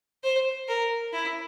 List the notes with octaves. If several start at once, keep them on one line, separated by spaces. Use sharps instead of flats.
C5
A#4
E4